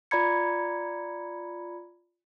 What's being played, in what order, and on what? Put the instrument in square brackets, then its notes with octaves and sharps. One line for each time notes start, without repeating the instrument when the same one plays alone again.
[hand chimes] F4 D5 A#5 B5 G#6 C#7